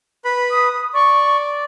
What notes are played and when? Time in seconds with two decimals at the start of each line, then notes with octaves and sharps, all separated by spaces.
0.25 B4 B5
0.51 D#6
0.94 D5 C#6